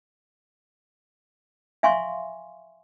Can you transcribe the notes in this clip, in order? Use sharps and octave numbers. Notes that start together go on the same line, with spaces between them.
E5 F5 G#5 C6 C#6